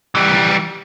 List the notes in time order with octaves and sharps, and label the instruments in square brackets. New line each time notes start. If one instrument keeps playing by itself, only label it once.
[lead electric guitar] E3 G3